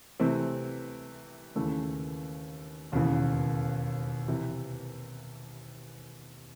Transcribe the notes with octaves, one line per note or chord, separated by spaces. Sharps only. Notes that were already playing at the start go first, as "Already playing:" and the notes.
C3 E3 A3 C4
D#2 C#3 E3 A3
E1 D#2 C#3 E3
C3 E3